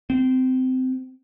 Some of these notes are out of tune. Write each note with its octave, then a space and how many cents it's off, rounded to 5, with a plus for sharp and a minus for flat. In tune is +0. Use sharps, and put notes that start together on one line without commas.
C4 -20